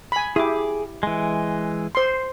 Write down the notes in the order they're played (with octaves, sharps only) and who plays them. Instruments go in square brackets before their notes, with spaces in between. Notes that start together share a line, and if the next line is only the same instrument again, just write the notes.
[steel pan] G#5 B5
[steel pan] E4 G4 [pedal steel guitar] G#4 D6
[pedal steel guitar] E3 G#3
[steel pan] C5 C6